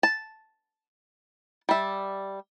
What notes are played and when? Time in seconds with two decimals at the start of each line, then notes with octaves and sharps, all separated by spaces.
0.03 A5
1.69 G3 E5